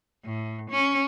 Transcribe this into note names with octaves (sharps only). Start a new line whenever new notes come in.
A2
C#4